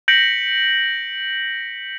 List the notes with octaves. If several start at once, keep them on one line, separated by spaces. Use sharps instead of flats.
G6 A#6 B6 C#7 D7 F#7